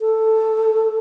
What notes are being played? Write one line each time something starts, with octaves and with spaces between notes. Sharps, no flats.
A4